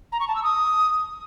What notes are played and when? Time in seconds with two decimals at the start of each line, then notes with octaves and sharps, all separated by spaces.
0.12 A#5
0.20 C#6
0.28 A5
0.35 E6
0.43 D#6